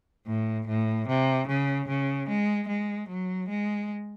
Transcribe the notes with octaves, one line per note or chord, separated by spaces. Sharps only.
A2
A2
C3
C#3
C#3
G#3
G#3
F#3
G#3